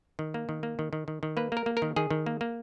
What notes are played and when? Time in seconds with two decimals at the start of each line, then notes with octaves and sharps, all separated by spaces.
0.19 D#3
0.34 A#3
0.49 D#3
0.63 A#3
0.79 D#3
0.93 D#3
1.08 D#3
1.23 D#3
1.37 A#3 B4
1.52 A#3 A#4
1.66 A#3
1.77 A#4
1.82 D#3
1.96 D#3 G#4
2.10 D#3
2.26 A#3
2.41 A#3